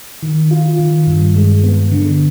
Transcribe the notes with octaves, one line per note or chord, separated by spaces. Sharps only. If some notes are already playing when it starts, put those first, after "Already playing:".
D#3
F4
D#3
G2
G#3
B3
D3